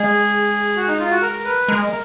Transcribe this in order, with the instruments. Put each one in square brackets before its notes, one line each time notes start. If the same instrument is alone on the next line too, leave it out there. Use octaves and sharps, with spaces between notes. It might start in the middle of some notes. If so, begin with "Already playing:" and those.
Already playing: [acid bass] G#3 [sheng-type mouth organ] G#4
[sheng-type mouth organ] F#4
D#4
F4
F#4
A#4
B4
[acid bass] G#3 [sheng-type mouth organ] A#4